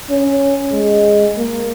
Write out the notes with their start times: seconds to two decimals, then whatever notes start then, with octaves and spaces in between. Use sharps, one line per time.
0.10 C#4
0.72 G#3
1.37 A#3